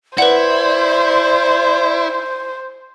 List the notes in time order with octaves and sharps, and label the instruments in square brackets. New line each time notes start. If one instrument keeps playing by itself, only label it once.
[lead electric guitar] E4 [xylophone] B4 F#5 [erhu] C5 [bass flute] D5